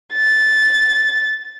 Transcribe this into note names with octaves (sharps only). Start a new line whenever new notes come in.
A6